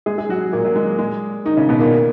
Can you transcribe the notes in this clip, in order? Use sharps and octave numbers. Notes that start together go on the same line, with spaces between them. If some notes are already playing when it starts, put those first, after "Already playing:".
G#3 G#4
G#4
F#3 F#4
A#2 A#3
F#3
G#3
G#3
D#3 D#4
C#3 C#4
B2 B3
A#2 A#3